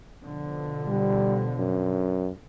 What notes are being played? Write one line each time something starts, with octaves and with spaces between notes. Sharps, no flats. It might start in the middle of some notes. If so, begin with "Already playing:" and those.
B2 D3 F3
G3
F#2